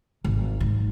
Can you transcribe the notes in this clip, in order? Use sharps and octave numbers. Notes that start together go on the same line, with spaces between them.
G#1
G#2